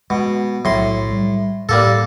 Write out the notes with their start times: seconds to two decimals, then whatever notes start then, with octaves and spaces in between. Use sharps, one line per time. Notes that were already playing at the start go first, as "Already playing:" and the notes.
0.10 B2 G#3
0.65 B1 A2 F#3 C6
1.11 G3
1.69 A2 G3 A#3 A4